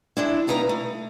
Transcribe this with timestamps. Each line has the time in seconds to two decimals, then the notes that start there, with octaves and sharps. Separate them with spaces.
0.17 G#3 D4 E4
0.47 G3 A#3 D#4 B4 A#5
0.69 A3